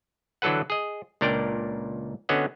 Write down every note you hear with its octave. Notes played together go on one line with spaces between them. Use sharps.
D3 E3 F#3 A4 B4 F#5
G#4 D#5
C#2 A#2 D4 A#4 D5 G5
D3 B3 C#4 F#4 D#5 F#5